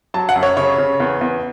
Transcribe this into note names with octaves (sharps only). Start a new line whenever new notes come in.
F#3 A5
F#5
F#2
C#5
C#3 C#5
C#3
E2
E2